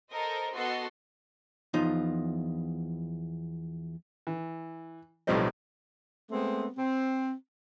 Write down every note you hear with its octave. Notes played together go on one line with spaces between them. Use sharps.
A4 A#4 C5 D#5
B3 F#4 A4 D#5 C6 C7
E2 F3 D#4 F4
E3
B1 A2 F3 G3 C4 D#5
G#3 A3 B3 C4
C4